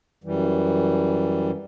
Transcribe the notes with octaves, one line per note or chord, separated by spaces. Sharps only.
F#2 E3 G3